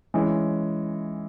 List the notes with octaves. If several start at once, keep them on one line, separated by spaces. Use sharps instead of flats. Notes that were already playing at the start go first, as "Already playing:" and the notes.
E3 G#3 C#4